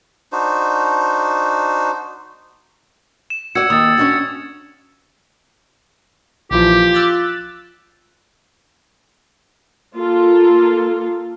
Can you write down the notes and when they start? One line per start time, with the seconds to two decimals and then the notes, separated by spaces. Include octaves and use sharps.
0.32 D4 D#4 F#4 C5
3.30 E7
3.55 F#4 D5 E6 G#6 C#7
3.70 D#2 D#6 E6 A6
3.98 C#4 D4 F#4
6.51 A#1 E3 F3 F4 G4
6.94 E6 F#6 A6
9.94 A#3 F4 A4